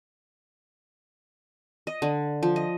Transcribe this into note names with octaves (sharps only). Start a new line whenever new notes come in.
D#5
D3
F3
D#5